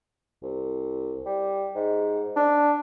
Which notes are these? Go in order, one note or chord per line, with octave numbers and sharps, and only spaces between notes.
C2
G3
G#2
D4